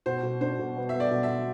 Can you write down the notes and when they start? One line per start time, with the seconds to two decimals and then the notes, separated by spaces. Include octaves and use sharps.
0.06 B2 C5
0.23 B2
0.41 D4 C5
0.59 B2
0.77 B3
0.89 E5
0.94 B3
1.00 D5
1.11 B2
1.23 E5
1.28 B2